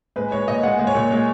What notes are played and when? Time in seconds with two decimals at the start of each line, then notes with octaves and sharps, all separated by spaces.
0.16 G#3 B4
0.32 G#3 C#5
0.48 A#2 D#5
0.63 G#3 F#5
0.79 G#3
0.87 C#5
0.95 A#2
1.11 G#3